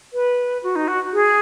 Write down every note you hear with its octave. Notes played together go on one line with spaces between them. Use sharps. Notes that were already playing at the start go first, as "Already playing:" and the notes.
B4
F#4
D#4
F#4
G#4